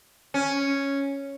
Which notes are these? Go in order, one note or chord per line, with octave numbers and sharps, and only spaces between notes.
C#4